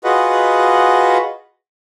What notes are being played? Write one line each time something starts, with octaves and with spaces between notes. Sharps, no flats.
F4 F#4 G#4 B4 D#5 F#5